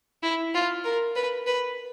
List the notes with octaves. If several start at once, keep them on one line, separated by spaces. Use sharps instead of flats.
E4
F4
A#4
B4
B4